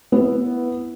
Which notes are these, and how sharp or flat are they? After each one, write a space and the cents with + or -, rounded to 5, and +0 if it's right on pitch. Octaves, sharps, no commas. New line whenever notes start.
B3 +0 E4 +0